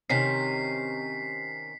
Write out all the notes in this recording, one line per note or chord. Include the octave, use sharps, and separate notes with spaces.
C3 D#3 C#4 B6 C7